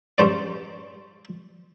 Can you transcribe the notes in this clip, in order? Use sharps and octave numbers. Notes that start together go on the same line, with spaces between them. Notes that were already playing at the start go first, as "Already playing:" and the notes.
G2 C#4 C5 D5